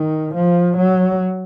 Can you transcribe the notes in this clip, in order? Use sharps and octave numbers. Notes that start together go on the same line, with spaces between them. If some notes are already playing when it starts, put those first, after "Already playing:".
Already playing: D#3
F3
F#3